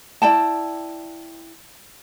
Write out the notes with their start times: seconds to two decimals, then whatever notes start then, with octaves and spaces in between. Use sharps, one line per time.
0.22 E4 D5 G5 A5